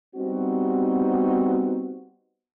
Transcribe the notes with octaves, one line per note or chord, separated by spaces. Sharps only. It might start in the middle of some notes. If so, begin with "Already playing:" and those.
G3 B3 C4 D#4 F#4